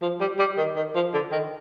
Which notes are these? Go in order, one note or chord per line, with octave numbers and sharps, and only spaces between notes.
F3
G3
G3
D#3
D#3
F3
D3
D#3